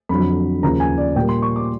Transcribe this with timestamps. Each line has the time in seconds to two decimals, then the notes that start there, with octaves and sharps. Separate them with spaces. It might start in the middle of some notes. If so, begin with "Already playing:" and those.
0.09 F2 D3 F#3 B5
0.62 D#2 C#3 F3 A#5
0.80 G#5
0.98 D5
1.16 A#2 G3 A#3 G5
1.29 C6
1.42 C#6
1.56 D6